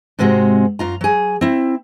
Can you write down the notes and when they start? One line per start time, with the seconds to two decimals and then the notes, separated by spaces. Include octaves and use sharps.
0.19 G#2 C3 G#3 C4 F#4
0.79 F#2 F4 A#5
1.01 F#3 G#4
1.41 C4 E4